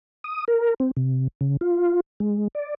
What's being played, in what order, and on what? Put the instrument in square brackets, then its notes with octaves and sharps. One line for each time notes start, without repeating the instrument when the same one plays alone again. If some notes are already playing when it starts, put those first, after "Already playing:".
[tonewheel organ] D#6
A#4
C4
C3
C#3
F4
G#3
D5